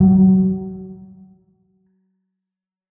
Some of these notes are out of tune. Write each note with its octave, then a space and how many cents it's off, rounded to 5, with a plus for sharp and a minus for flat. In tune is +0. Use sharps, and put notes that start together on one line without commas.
F#3 +30